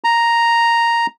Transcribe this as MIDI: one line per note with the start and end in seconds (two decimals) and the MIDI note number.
0.04 1.06 82